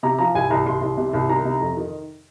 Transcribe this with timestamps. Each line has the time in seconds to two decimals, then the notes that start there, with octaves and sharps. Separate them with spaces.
0.03 C3 A#5
0.19 F3 A#5
0.35 C2 G#5
0.50 C2 A#5
0.66 C2 C6
0.81 C2
0.97 C3
1.13 C2
1.29 D#3 A#5
1.45 C3
1.61 F2
1.77 D#3